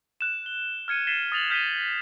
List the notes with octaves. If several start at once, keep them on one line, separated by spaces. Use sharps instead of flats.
F#6 E7
G7
F6 G#6 C#7 D#7
A6 B6 C7 D#7 E7 G7
D#6 A6 F7 F#7
F6 G6 B6 C7 D#7 G7